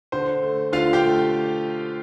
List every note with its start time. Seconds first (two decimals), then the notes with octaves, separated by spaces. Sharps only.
0.12 D3 C5
0.43 A3
0.73 D3 F4 F5
0.93 G4 G5
1.03 A3